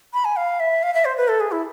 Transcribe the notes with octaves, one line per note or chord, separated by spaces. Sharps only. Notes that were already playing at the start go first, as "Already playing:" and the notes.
B5
G#5
F5
E5
F5
E5
C5
B4
A4
G#4
E4